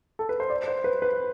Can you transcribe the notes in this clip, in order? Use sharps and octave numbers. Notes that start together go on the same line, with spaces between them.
A4
B4
C5
D5
C5
B4
B4